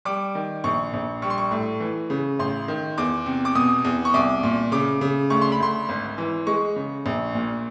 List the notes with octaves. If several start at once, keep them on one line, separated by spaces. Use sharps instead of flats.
G3 D6
D#3
A#1 C#6
A#1
G3 C#6
C6
C#6
A2
E3
C#3
A1 C6
D#3
E2 D6
C3
D6
B2 D#6
E2
C#6
C2 D6
A#2
C#3 D6
C#3
D2 C#6
C6
B5
D2 C6
G#1
E3
G#3 C#6
C#3
A#1
A#2